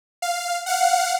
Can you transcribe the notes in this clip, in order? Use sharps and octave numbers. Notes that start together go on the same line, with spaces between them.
F5
F5 F#5